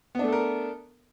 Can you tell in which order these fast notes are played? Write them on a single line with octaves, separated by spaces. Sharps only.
B3 D4 A3 A4 A#4